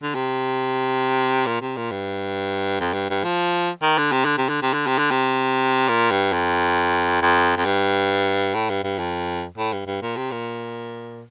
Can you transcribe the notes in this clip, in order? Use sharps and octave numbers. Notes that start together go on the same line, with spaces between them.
D3
C3
A#2
C3
A#2
G2
F2
G2
G2
F3
D#3
D3
C3
D3
C3
D3
C3
D3
C3
D3
C3
A#2
G2
F2
F2
F2
G2
A2
G2
G2
F2
A2
G2
G2
A#2
C3
A#2